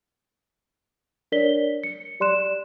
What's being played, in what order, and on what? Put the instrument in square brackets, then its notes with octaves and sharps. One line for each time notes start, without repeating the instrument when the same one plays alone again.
[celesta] D4 A#4 C#5 D5 B6 G7
C#7
G4 D5 C6 F#6 E7